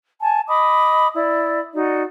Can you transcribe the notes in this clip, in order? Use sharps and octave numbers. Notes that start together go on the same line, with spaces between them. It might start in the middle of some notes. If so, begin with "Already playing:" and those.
G#5 A5
D#5 B5 D6 D#6
E4 D5
D#4 F#4 D5